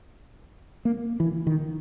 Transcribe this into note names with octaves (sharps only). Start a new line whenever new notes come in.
A#3
E3
D#3